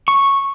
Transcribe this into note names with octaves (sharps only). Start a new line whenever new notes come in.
C#6